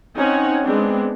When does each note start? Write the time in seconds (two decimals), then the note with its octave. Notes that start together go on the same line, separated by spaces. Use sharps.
0.16 C4 C#4 D#4 C#5 F#5 G#5
0.64 G#3 B3 C4 D4